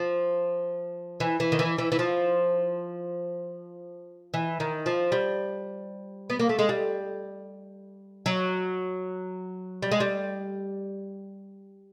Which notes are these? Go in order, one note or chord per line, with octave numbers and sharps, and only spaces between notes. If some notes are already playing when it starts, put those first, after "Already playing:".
Already playing: F3
E3
E3
D#3
E3
E3
E3
F3
E3
D#3
F3
G3
B3
A#3
A3
G#3
G3
F#3
G3
G#3
G3